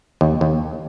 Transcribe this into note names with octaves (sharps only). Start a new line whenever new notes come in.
D#2
D#2